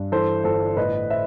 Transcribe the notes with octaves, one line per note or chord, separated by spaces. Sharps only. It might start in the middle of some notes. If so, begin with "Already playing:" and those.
Already playing: G2
E3 A4 C5
G1 A4 C5
A2 B4 D#5
C5 E5